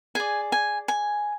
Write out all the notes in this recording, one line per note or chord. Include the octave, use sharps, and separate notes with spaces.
G#4 D5 G#5
G#5
G#5